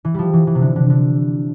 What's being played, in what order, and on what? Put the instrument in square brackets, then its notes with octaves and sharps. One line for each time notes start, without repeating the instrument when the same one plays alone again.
[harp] E3
F3 G3
E3
E3
C3
D3
D3
D3